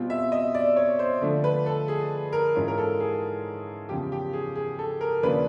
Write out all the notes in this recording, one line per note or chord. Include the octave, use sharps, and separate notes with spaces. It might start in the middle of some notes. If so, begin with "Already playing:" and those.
Already playing: B2 G3 C4 F4
E5
D#5
D5
C#5
C5
D3 F3 A3 D4
B4
A4
G#4
A#4
G#2 E3 G#3 C#4 F4
A#4
A4
G#4
E2 C#3 F3 G4
G4
G#4
G#4
A4
A#4
D#2 C#3 F3 A#3 D4 B4